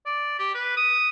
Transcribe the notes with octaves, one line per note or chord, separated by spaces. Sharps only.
D5
G4
B4
D#6